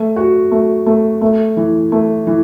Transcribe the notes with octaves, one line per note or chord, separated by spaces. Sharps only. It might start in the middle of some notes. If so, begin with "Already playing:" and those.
Already playing: A3
F#4
A3
A3
A3
E3
A3
E3